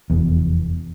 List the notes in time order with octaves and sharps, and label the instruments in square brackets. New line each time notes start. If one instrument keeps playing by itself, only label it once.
[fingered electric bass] F1 E2